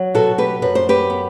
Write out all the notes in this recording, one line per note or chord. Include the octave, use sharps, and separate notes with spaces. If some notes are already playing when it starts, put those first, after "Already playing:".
Already playing: F#3
B2 F#4 A4
G4 B4
F#2 B4
C5
G4 B4
B3